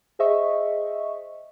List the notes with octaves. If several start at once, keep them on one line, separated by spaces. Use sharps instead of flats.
G#4 C5 D#5 E5 C#6